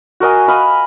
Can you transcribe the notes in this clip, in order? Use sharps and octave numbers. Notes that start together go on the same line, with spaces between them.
F#4 A#4 D#5 G#5
D#5 F5 B5